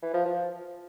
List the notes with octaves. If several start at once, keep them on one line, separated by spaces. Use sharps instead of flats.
E3
F3
F3